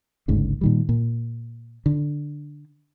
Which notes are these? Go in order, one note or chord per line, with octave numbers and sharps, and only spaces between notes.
G1 D2 G#2 C#3
A#2 D#3 G3
A#2
D3